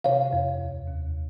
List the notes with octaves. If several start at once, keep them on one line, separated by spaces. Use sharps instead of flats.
C3 C#5 F5
F2
D#2
D#2